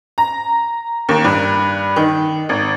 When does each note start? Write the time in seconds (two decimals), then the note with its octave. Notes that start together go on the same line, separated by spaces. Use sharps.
0.18 A#5
1.09 D#2
1.24 G2
1.96 D#3
2.49 G#1